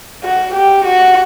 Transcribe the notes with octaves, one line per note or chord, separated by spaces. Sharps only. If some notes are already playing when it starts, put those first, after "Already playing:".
F#4
G4
F#4